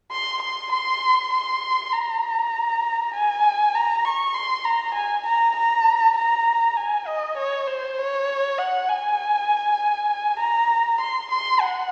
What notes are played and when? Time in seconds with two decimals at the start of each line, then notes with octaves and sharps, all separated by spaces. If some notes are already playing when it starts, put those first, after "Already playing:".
0.11 C6
0.42 C6
0.72 C6
1.33 C6
1.92 A#5
3.14 G#5
3.75 A#5
4.05 C#6
4.35 C6
4.65 A#5
4.95 G#5
5.26 A#5
5.56 A#5
6.17 A#5
6.77 G#5
7.07 D#5
7.37 C#5
7.67 C5
7.98 C#5
8.59 F#5
8.89 G#5
10.39 A#5
11.01 C6
11.31 C6
11.61 F#5